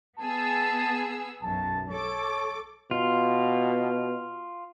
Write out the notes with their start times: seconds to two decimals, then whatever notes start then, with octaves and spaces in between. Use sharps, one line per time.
0.19 B3 G#4 A5 E6
1.43 B1 F#2 A5
1.89 A4 C#5 D6
2.91 B2 F4